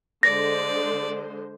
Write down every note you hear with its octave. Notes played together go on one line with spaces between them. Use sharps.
D3 G#3 C5 D5 A#6